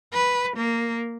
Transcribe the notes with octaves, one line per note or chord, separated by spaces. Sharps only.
B4
A#3